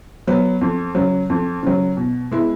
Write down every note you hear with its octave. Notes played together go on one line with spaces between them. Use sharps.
F#3 B3
F2
C#3 F#3
F2
C#3 F#3
B2
G#3 B3 E4